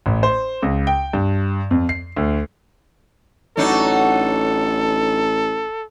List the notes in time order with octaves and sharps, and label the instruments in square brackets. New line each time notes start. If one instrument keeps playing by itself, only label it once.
[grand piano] A1
C5
C#2
G5
G2
F2
C7
D2
[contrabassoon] A1 [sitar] F#3 D4 D#4 [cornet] A4